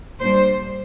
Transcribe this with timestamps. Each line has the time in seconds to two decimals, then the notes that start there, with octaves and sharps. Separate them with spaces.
0.20 A#2 G3 D4 C5